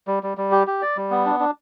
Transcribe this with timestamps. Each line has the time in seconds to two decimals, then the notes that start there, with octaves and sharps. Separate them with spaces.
0.07 G3
0.23 G3
0.37 G3
0.51 G4
0.67 G4
0.82 D5
0.97 G3
1.11 B3
1.26 D4
1.40 D4